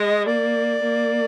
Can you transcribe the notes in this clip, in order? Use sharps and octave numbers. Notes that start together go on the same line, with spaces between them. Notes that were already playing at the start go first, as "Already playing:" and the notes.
Already playing: G#3 D#5
A#3 D5
A#3